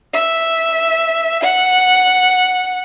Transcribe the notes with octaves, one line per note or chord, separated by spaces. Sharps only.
E5
F#5